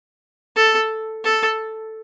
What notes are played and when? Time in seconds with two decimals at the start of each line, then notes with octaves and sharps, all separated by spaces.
0.56 A4
1.24 A4